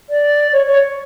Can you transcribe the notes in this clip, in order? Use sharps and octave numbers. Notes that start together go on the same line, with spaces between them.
D5
C#5
C#5